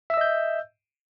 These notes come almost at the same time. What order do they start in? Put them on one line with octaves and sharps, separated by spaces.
E5 E6 D#5 G6